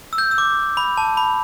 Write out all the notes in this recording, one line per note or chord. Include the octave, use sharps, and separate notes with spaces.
E6
G6
E6
D6
B5
A5
B5